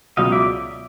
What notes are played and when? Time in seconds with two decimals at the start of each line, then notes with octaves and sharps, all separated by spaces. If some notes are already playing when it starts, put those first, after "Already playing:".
0.17 C#2 B2 F#3 D#5 F5
0.32 D5 E5